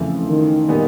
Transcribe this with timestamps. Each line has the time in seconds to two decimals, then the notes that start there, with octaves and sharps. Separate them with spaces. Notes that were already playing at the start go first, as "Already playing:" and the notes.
Already playing: F2 C#3 E3 A3
0.27 D#3
0.69 A#2 G3 B3 D#4